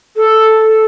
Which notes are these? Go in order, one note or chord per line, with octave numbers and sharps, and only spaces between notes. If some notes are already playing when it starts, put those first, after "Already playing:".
A4